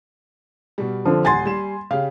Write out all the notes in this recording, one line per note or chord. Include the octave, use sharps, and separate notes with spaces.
B2 G3
D3 F3 C4
D#1 F#5 G#5 C6 A6
G3 E7
C#3 G4 F5